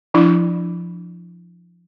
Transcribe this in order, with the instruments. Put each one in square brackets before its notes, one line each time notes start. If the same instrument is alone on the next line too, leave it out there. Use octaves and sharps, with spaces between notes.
[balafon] F3 D4 E4